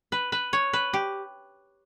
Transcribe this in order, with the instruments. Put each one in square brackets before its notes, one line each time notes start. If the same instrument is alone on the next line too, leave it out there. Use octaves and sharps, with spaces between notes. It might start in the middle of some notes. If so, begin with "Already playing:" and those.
[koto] B4
B4
C#5
B4
G4